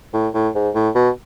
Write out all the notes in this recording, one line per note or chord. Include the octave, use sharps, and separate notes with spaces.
A2
A2
G#2
A2
B2